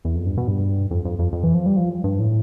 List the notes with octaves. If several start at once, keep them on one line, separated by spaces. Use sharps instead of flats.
E2
F2
G2
B2
G2
F2
F2
F2
F2
E3
F3
G3
F3
G2
A2